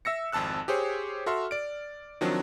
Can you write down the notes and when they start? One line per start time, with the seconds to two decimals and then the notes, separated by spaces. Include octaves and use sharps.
0.05 E5 E6 A#6 C#7
0.32 G#1 F2 A5 E6 F#6
0.68 G4 G#4 C5 C#5
1.26 F#4 A4 E5 C6 F6
1.51 D5 D7
2.21 D#3 F3 F#3 C4 D4